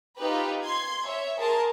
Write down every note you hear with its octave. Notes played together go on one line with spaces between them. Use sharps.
D#4 F4 G4 B4
C6 G#6
C#5 E5
G#4 A#4 A5 C6